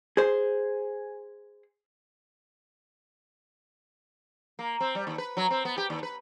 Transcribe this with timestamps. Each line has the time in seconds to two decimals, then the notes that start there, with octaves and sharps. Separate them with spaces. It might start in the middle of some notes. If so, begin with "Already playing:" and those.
0.17 G#4 C5
4.59 A#3
4.80 C4
4.95 G3
5.07 D#2
5.18 B4
5.37 F#3
5.50 C4
5.65 B3
5.78 G4
5.90 D#2
6.03 B4